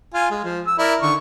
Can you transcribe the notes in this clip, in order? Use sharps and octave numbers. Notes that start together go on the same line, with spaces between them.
F4 G#5
G#3
F3
E6
E4 A#4 D5
D3 D#3 C#6